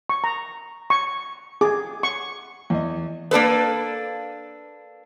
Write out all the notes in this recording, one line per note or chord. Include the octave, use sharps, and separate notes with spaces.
C#6
A#5
C#6
G#4 D6
C#6
E2 D#5
A#3 D4 A4 B4